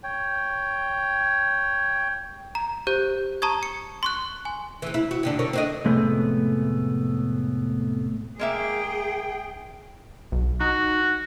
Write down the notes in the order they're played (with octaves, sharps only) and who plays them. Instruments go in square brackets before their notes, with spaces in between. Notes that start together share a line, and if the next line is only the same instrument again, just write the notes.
[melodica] C#5 G5
[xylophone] A#5
G4 C5 G6
A5 A#5 C#6 D#6 G#6
C#7
C6 C#6 F#6
G#5
[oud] C#3 E3
E4
F#4
G2 D3 D4
D3 A#4 C#5
C4 D4 D#5
[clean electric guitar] F2 A2 C3 G#3 A3 B3
[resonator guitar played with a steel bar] G#3 A#3 E5 [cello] G#4 G5
[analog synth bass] B1
[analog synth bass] D#4 [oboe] F#4